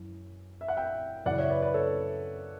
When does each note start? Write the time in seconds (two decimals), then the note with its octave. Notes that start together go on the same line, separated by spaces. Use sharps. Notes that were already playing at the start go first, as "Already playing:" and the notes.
Already playing: F#2 E3
0.61 E5
0.68 F#5
0.77 E5 G5
1.26 F#2 C#3 E3 D5 F#5
1.38 C#5 E5
1.49 B4 D5
1.62 B4 D5
1.74 A4 C#5